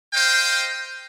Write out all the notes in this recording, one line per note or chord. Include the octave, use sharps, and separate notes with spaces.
C5 D#5 F5 G5